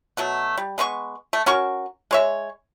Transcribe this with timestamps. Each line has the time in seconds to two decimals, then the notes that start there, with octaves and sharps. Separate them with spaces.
0.17 B2 F#3 A3
0.57 G3
0.78 G#3 B3 D#4 C#6
1.33 A3
1.46 C#4 F#4 A#4 C#6
2.11 G#3 C#5 E5